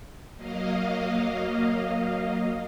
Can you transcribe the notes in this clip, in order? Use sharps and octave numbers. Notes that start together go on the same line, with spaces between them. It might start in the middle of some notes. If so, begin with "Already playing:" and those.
F#3 A#3 D#5 F5